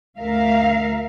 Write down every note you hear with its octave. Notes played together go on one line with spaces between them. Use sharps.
D2 A#4 E5 F5